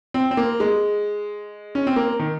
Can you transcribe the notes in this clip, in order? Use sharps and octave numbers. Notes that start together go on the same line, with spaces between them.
C4
C4
A#3
G#3
C#4
C4
A#3
D#3